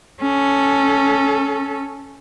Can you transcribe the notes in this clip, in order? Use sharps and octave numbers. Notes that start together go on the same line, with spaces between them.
C#4 A4